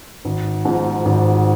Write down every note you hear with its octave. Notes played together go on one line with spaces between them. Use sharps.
G#1
G#2 F3
G#1